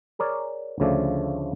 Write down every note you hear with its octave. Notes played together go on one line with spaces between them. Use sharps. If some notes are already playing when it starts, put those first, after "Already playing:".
G#4 A#4 C#5 D5
D2 C#3 F3 A3 A4 D5